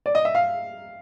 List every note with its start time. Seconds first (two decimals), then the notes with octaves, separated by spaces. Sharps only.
0.06 D5
0.15 D#5
0.25 E5
0.35 F5